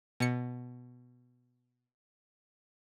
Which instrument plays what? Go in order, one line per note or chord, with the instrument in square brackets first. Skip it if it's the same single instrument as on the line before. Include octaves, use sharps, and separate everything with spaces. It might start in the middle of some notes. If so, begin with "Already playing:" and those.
[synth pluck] B2 C#7